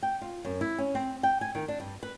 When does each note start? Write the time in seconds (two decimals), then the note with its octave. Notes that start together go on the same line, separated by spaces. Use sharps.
0.03 G5
0.22 F4
0.45 F#2
0.61 E4
0.79 C#4
0.95 C4
1.23 G5
1.41 G#5
1.55 D#3
1.68 D4
1.80 G2
2.03 B4